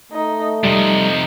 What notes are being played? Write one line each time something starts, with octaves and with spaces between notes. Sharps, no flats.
A3 D#4
F2 C3 G3 D#4